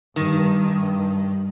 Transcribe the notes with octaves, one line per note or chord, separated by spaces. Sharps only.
G2 D#3